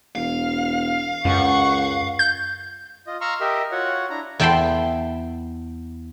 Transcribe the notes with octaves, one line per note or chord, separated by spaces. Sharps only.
E1 F5
C#2 F#2 F#5 C#6
G6
F4 D#5
F5 A#5 C6 C#6 E6 F6
G4 A#4 D#5 E5
F4 F#4 C#5 F#5
D4 E4 A#5
E2 E4 G5 A5 B5 C6